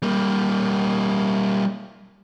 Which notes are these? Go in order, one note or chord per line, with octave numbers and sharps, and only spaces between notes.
G3 A#3